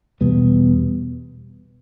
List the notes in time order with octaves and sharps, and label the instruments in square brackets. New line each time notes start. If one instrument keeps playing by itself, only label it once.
[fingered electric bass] E2 B2 G3 B3